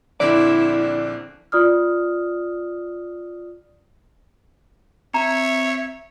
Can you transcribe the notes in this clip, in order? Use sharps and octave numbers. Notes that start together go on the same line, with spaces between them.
A#1 D3 C4 E4 D5
F4 D5 D#6 F6
C4 C#5 E5 A#5